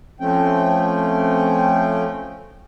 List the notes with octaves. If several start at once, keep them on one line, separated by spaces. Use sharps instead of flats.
F3 A3 C4 C#4 G5